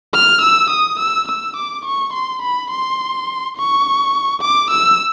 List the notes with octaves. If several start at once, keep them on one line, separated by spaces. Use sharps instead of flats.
F6
E6
D#6
E6
E6
D6
C#6
C6
B5
C6
C#6
D6
E6